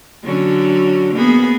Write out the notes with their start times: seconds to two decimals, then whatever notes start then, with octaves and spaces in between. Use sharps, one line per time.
0.24 D3 F#3 C#4
1.13 A#3 B3 G#4